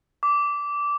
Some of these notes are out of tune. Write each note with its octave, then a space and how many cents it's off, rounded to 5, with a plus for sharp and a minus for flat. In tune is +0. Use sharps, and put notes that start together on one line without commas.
D6 -15